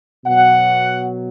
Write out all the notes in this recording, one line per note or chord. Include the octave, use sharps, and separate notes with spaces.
B2 F#3 F#5